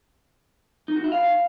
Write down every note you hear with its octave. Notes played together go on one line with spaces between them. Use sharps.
D#4
F#4
E4
F5